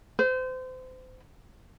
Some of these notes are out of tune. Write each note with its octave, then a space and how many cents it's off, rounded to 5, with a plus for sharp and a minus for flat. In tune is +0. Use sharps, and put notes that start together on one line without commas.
C5 -30